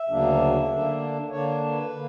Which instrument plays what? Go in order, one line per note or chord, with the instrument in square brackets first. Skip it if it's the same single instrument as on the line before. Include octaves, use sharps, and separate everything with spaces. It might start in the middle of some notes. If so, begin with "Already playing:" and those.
Already playing: [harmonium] E5
D2 C#3 F#3 A#3 D4
D3 A#3 D4
D3 A#3 D4 C#5
B4
D3 A#3